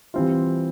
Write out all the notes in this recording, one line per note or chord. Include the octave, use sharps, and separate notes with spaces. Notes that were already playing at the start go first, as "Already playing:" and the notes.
E3 G3 C4 F4